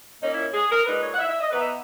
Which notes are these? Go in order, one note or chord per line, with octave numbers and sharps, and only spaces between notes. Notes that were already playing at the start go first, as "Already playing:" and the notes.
A#2 A#3 C#4 D#4
E4
G#4
A#4
A#2 G#3 D#4 B4
C#5
F#5
E5
E5
D#5
E3 B3 D#4 B4
E5